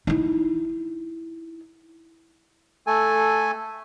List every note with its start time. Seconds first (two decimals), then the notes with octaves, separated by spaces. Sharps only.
0.07 D#4 E4
2.87 A3 A4 G#5